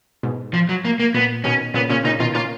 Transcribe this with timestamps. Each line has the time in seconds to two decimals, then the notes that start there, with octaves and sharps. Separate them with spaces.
0.23 G#2 B2
0.54 F3
0.69 F#3
0.85 A#3
1.00 A#3
1.14 A#2 B3
1.44 B2 D#3 C#4
1.74 A#2 C#3 B3
1.89 A#2 C#3 C#4
2.04 A#2 C#3 D#4
2.20 B2 D#3 F4
2.35 A#3 C#4 F4